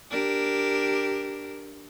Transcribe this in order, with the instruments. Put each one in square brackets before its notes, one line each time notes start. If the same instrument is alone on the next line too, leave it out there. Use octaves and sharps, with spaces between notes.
[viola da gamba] D4 G4 A#4